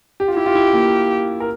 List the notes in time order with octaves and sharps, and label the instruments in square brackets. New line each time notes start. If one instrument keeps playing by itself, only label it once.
[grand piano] G4
F4
[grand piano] E4 [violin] G4
[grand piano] F4
E4
A#3
A#4